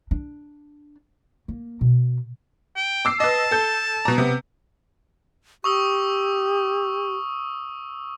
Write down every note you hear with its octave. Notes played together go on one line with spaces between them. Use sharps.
D4
A#3
B2
G5
D6 E6 C7
B4 D#5 A5
A4 G6
B2 A#5
C3 B3
G4 C#6 D#6 E6